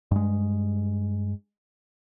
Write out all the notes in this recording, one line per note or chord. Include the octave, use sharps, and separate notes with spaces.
G2 G#3